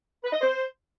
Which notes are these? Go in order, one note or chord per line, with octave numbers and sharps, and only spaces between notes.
B4
D#5
C5